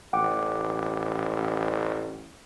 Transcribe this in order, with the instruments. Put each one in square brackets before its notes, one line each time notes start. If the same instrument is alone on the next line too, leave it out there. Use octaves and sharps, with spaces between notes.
[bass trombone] A1 [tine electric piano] F#5 G5 D6